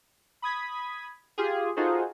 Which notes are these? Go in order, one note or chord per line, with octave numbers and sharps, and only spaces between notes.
B5 D#6 G#6 B6
F4 G4 G#4
D#4 F4 F#4 G#4 A4 C5